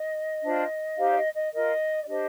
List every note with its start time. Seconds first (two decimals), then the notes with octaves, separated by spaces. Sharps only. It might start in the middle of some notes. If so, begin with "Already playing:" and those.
Already playing: D#5
0.42 D4 F4 C5
0.96 D#4 G4 C5 F5
1.08 D5
1.15 D#5
1.34 D#5
1.52 F4 A#4 D#5
2.02 D5
2.06 D4 G4 C5 D#5